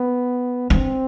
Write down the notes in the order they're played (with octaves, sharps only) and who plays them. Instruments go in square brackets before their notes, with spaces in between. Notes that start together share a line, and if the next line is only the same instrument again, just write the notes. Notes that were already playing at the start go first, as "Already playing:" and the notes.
Already playing: [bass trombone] B3
[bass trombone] C4 [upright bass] D4